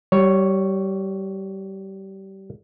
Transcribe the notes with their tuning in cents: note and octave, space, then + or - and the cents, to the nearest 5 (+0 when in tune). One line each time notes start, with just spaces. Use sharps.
G3 -25 C#5 +0